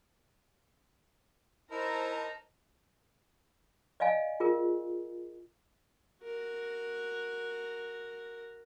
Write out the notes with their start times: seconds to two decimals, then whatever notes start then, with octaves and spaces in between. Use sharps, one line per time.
1.71 D#4 E4 A#4 C5 A5 A#5
4.00 D5 D#5 F5 G#5
4.40 F4 G#4 A#4
6.24 F#4 A#4